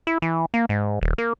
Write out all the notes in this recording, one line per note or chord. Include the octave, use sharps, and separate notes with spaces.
E4
E3
A#3
G#2
D#1
A#3